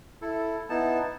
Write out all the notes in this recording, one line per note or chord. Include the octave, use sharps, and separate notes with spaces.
E4 A4
B3 D#4 E4 A5